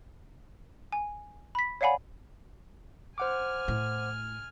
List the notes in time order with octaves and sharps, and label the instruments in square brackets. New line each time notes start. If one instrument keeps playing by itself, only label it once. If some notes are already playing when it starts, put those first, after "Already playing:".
[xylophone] G#5
B5 B6
C#5 D5 F5 F#5 G#5 B5
[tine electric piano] C5 F#5 D6 [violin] G#5 F6
[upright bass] A2